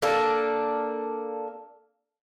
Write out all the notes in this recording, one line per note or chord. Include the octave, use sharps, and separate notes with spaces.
A#3 D4 A4